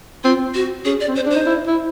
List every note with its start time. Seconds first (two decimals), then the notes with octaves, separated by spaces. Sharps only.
0.24 C4 F4
0.55 F#4
0.85 C#4 G#4
1.01 D5
1.08 C4
1.15 C#4 C5
1.26 D4
1.30 C5
1.36 D#4
1.46 E4
1.67 E4